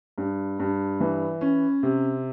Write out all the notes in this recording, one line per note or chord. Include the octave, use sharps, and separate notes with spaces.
G2
G2
E3
C#4
C3